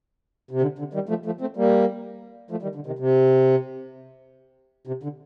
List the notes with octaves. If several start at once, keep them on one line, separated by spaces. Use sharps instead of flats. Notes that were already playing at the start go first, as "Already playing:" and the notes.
C3
D3
D3
D#3 G3
F3 A3
F3 A3
A3 C4
G3 A#3
F3 A3
D#3 G3
D3
C3 D#3
C3
C3
D3